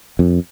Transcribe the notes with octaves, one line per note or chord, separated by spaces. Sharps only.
F2